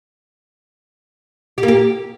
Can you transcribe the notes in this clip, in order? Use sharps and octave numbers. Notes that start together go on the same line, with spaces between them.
G4
A#3
G4